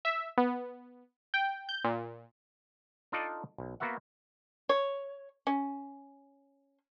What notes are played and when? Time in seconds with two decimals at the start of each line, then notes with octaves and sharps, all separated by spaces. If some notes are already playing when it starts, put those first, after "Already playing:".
0.05 E5
0.38 B3
1.34 G5
1.69 G6
1.84 A#2
3.12 D4 D#4 F4 A4 D5 D#5
3.58 B1
3.80 A#3 B3 F#4 E5 F#5
4.69 C#5
5.47 C#4